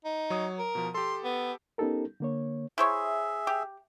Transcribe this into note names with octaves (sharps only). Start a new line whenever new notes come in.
D#4
F#3 C#5 D#6
A#4
B2 F3
G4 A4 C6
B3
B3 C#4 D#4 G4 A4 A#4
D3 A#3 C#5
E4 G#4 C5 C#5 E5
G4